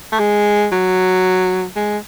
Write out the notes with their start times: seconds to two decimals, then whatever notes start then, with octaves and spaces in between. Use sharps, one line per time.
0.12 A3
0.20 G#3
0.72 F#3
1.76 G#3